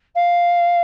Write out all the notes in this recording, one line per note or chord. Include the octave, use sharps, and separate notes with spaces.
F5